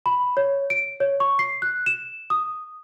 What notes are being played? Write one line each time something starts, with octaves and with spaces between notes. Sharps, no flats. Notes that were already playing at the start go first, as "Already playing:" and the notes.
B5
C#5
D7
C#5
C#6
C7
F#6
E7
D#6